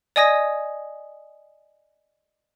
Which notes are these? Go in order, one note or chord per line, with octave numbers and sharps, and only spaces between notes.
D5 D#5 G#5 D#6 G#6 A#6